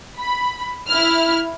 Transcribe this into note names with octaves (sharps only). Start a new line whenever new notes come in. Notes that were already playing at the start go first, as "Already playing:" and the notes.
B5
E4 F6